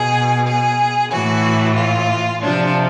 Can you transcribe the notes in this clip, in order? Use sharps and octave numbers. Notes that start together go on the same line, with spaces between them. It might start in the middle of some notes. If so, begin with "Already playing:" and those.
Already playing: B2 G#4
G#4
A2 E3 F#4
F4
C3 F3 D4